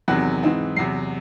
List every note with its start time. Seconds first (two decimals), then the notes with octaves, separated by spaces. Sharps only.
0.08 E2 C3 D#3 F#3 C4 F#6
0.42 G#2 E3 C4 D#4
0.76 E2 C3 F#3 C7